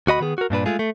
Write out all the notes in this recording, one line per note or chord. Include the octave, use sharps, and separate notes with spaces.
D2 F#4 D#5 B5
D#3 B3 G#4
F#4 A#4
G2 A#2 D4 B4
G#3 A3 F4 G#4
A3